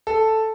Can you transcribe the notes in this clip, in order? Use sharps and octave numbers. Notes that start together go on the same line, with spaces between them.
A4